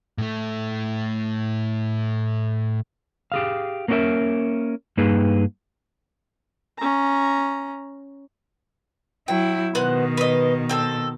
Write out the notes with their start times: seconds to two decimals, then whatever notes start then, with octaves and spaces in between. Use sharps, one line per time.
0.18 A2 A3
3.32 G4 G#4 F5
3.88 A#3 C4 C#4 F#4 A#4 E5
4.97 G2 A#3 D#4 G#4 B4
6.78 C#4 A#5
9.28 F#3 E4 G5
9.75 B2 D#3 B3 C5 F#6
10.17 B4 D#5
10.69 C4 A4